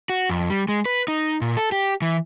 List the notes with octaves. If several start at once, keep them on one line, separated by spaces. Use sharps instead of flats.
F#4
F2
G3
G#3
B4
D#4
A#2
A4
G4
E3